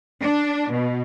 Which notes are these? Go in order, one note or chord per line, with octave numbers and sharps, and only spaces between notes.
D4
B2